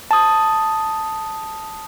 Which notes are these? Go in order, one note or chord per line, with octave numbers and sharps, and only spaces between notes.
A5 D#6